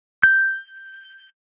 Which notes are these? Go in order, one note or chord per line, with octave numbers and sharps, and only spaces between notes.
G6